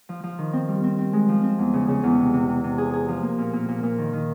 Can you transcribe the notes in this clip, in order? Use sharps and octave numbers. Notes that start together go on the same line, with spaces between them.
F3
F3
D#3
C4
G3
C4
C4
G#3
F3
C4
E2
C#3
C#3
E2
C3
C3
C3
C3
G#4
G#4
F3
A#3
A#2
A#2
A#2
A#2
D#3
D#3